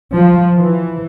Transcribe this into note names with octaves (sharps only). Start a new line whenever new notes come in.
F3
E3